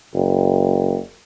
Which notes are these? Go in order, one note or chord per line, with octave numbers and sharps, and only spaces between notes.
F#1